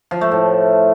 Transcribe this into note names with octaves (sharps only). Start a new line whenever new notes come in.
F3
A3
A2